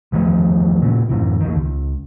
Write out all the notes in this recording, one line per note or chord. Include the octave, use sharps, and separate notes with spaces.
E2 D#3 F3 A3
A#2 C#3
F#2 A2 C3 E3
E2 D#3
C#2